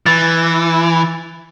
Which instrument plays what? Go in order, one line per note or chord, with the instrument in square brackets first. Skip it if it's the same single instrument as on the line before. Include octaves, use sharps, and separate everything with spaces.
[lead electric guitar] E3 [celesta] A6